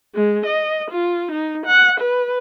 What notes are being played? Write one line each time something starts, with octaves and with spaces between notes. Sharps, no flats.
G#3
D#5
F4
D#4
F#5
B4